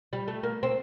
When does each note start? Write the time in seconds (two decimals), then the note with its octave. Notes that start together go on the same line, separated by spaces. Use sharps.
0.13 G3
0.28 A3
0.43 A#3
0.63 C4